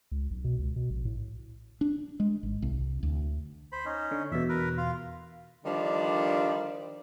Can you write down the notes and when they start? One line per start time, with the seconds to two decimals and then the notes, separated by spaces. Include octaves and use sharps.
0.12 C#2
0.31 B1
0.44 B2
0.59 C#2
0.76 B2
0.90 A#1
1.05 A2
1.81 D4
2.20 G#3
2.43 G#1
2.62 C2
3.03 D2
3.72 C5 B5
3.85 C#4 D#4
4.12 D3
4.32 E2 B2 E5
4.49 A#4 B4
4.78 F4 F5
5.65 D3 D#3 F3 G3 D4